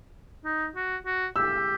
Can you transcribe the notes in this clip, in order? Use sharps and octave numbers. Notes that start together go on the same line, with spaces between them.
D#4
F#4
F#4
G4 E6